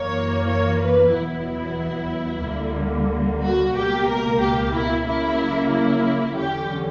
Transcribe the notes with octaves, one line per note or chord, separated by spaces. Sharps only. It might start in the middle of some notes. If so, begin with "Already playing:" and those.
Already playing: F#2 E3 A#3 C#5
C#5
B4
E2 B2 F#3 B3 E4
D2 D3 G3 A#3
F#4
C#2 B2 A#3 G4
A#4
G4
E4
C#3 F#3 A#3 E4
E4
E2 D3 F#3 C#4 G4